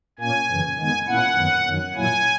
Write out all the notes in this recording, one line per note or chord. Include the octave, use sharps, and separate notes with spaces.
A#2 A#3 C#4 G#5
F#2 C#3 E3
D#3 G#3 B3 G#5
A#2 A#3 C#4 E4 F#5
F#2 D#3 F#3 B3
F#2 D#3 F#3
A#2 F#3 A#3 E4 G#5